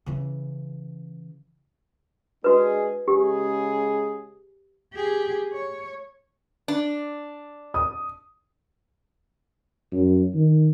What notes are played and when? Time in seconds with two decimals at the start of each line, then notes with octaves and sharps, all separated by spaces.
0.06 C#3 E3
2.44 G#3 D4 F#4 G#4 B4
3.08 C#3 G#3 G4 G#4
4.94 G4 G#4
5.53 C#5
6.68 D4
7.74 D#6
9.93 F#2
10.35 D#3